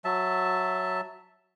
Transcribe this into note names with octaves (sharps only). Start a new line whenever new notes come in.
F#3 E5 A5